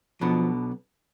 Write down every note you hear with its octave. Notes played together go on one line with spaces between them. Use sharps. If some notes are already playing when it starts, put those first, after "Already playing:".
B1 B2 F3 B3 D4